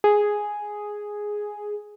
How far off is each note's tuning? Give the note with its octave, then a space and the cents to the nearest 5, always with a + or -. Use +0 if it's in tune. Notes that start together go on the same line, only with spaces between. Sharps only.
G#4 +0